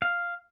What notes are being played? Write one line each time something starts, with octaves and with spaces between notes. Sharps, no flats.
F5